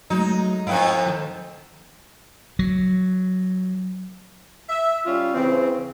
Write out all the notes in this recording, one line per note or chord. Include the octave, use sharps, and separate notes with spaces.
F#3 G#3 A3 D#4
F2 B3 E4 F5 G5
D#3 A4 C5
F#3
E5
G3 C#4 F4
C#3 E3 C4